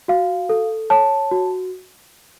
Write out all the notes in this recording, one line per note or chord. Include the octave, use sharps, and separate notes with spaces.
F#4 F5
A4
C#5 A5
F#4